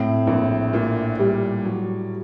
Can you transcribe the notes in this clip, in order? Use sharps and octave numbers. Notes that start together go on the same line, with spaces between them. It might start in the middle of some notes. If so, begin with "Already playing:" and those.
Already playing: A2 C4
A#1
A#2
G3
F#3